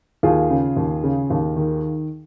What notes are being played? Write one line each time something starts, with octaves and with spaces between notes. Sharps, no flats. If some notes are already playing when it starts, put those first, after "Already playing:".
D#2 F4 G#4
C#3
D#2
C#3
D#2
D#3